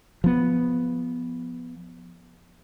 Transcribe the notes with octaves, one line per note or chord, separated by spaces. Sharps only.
F3 B3